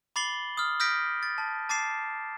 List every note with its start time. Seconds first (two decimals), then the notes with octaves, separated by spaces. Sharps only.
0.16 B5 D6 A6 C7 F#7 G7
0.57 D#6 F6
0.80 D#6 F6 G6 A#6 B6 D7
1.23 A6
1.38 A5
1.69 A5 D6 A6 C7 E7